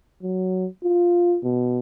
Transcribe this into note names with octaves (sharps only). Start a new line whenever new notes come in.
F#3
F4
B2